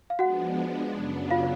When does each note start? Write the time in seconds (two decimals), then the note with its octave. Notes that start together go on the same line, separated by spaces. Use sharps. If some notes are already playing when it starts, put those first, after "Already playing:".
0.10 F5
0.19 F3 G#3 B3 D4 F#4 F#5
0.94 F#2 C#3 F#3 B3 D4
1.31 F4 F5